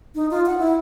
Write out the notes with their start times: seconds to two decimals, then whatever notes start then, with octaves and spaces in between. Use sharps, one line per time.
0.15 D#4
0.31 F4
0.46 F#5
0.58 E4